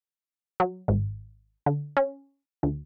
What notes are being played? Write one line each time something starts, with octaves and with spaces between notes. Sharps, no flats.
F#3
G#1
D3
C#4
D2